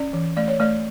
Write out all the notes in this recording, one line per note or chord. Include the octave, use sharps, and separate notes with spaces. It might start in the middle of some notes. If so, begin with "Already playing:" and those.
Already playing: C#4 D5
E3
A3 D5
C#5
A3 D5